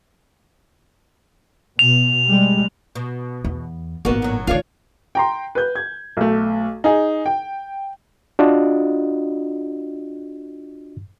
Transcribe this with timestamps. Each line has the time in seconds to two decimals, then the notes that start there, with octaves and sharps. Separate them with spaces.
1.79 B2 F7
2.27 G3 G#3
2.95 B2
3.44 E2
4.05 G#1 A#2 A#3 B3 F#4
4.22 A2 F#3
4.47 A2 D#3 D4 F4 C#5 F5
5.15 G5 A#5 C6
5.55 B4 G6
5.76 G#6
6.17 B1 A3
6.84 D#4 G#4
7.26 G5
8.39 D4 F4 F#4 D#5